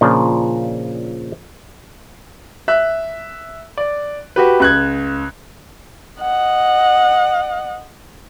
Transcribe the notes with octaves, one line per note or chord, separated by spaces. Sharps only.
A#2 C#3 F3 D4 F4
E5 F#6
D5
F#4 G4 B4
C#2 F#6 G#6
D#5 F#5